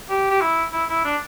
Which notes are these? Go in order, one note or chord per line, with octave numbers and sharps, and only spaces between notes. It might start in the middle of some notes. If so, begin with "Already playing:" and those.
G4
G4
E4
E4
E4
D4